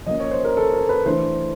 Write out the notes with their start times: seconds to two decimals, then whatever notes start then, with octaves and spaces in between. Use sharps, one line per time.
0.06 F3 A#3 C#4 D#5
0.20 C#5
0.31 C5
0.45 A#4
0.57 A4
0.73 A#4
0.89 B4
1.06 E3 A3 D4 C5